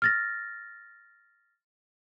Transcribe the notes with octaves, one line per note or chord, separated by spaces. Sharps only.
F6 A6 A#6